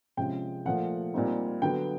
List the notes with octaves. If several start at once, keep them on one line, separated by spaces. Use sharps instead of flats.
C3 F3 G#3 C#4 G5
A#2 F3 A3 F#5
A#2 G3 C4 D#4
D3 F#3 B3 G5